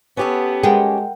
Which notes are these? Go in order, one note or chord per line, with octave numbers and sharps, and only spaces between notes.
B3 C#4 G4 A4
G#3 A#4 F#5 G5